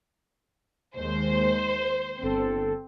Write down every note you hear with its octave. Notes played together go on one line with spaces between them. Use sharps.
D#2 D#3 G#3 C5
G1 C4 A4